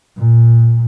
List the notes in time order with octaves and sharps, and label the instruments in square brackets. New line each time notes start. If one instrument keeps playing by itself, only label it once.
[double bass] A#2